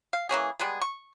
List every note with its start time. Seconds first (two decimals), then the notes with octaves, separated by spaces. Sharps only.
0.13 F5
0.29 E3 A#3 C#4 G#4
0.59 G3 G#3 B3 G#4
0.81 C#6